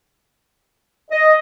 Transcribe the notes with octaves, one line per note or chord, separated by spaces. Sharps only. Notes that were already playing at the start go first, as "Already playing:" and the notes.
D#5